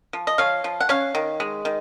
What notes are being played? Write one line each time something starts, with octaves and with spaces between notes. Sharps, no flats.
F3
D#5
F3 C#5 F5
F3
F#5
C#4 C#5 F5
D#3
G#3
D#3